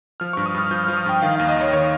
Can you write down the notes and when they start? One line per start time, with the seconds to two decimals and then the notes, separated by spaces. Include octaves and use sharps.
0.20 F3 F6
0.33 G2 C#6
0.46 D#6
0.54 G2 F6
0.71 F3 G6
0.84 F3 F6
0.97 D#6
1.06 G2 G5
1.22 D#3 F5
1.36 D#2 F5
1.48 D#5
1.56 D#2
1.61 C#5
1.73 D#3 C#5